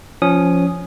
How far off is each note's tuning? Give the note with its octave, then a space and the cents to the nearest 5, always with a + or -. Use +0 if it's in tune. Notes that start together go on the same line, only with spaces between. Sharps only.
F3 +0 C#4 +10 D#6 -10